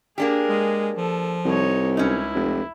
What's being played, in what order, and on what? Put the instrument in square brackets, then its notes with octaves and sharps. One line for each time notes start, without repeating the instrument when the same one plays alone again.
[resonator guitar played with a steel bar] A#3 D4 G4 [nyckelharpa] G#4 A#4
[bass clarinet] G#3
[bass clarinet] F3 [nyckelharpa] A4
[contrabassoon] C2 [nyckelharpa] D#4 C#5
[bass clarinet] C#2 [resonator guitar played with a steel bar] C#4 D#4 [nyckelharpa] E4
[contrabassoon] F1